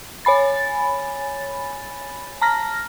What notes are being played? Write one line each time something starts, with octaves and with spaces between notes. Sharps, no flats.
C#5 G#5 B5 A6
A5 A#5 F6 A#6